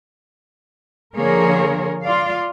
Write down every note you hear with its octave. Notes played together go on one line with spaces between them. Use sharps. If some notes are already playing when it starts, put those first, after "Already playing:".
D3 F3 A#3 G#4 A#4 C#5
F4 D5 F5